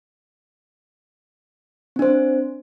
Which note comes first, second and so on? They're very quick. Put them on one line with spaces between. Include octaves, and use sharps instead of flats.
C4 D4 C5